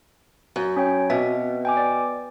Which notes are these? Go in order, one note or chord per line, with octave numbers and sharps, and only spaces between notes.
F#2
C#4 C#5 G5
B2 C4 E5
G5 G#5 D6
D5